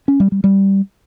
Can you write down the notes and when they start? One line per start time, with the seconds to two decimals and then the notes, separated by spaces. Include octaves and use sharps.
0.08 C#4
0.20 G3
0.32 G3
0.44 G3